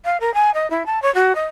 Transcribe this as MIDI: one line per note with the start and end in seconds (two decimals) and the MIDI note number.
0.05 0.17 77
0.20 0.33 70
0.34 0.51 80
0.54 0.69 75
0.70 0.86 64
0.86 1.02 81
1.02 1.13 73
1.14 1.35 66
1.35 1.45 75